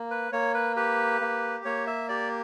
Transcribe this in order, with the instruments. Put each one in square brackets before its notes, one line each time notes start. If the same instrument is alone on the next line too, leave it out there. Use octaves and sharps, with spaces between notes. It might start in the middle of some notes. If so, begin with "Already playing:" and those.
Already playing: [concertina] A#3
B4
A#3 C#5
B4
G4 B4
A#3
A#3 C#5
E5
G4 D5